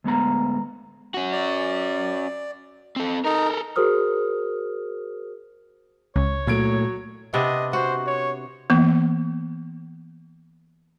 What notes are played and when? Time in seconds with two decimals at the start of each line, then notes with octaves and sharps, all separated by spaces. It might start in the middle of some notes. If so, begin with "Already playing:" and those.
0.04 D2 G#3 B3 A#5
1.14 C#4 F#4
1.32 D5
2.96 C4 A4
3.24 D#4 A4 A#4
3.76 F#4 G#4 A#4 C5 D#6 F6
6.16 C#2 C#5
6.47 A#2 F#3 A3 G#6 D7
7.34 C3 B3 D4 D#5
7.73 F#4 C5
8.07 C#5
8.70 E3 A#3 B3